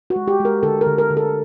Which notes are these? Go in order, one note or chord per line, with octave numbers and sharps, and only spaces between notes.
F#4
G#3
G4
G#3
A#4
D3 A4
A#4
D3
A#4
D3
A4